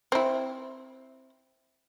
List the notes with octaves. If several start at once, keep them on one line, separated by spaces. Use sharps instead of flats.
C4 E4